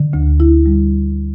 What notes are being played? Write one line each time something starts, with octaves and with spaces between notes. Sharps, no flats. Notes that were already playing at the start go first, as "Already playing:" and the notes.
Already playing: D3
D2
E4
G3